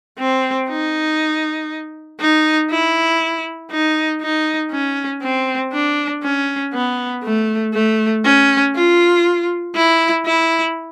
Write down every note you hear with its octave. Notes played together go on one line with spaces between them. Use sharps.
C4
D#4
D#4
E4
D#4
D#4
C#4
C4
D4
C#4
B3
A3
A3
C#4
F4
E4
E4